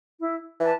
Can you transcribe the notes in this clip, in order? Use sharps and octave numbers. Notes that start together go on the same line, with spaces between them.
E4
E3 B4 D5 A5